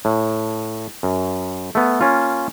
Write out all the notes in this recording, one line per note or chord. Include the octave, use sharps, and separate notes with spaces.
A2
F#2
A3 B3
A#3 C#4 F4